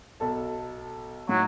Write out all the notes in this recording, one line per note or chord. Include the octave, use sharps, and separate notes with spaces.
B1 A4 A5
A2 F#3 D#4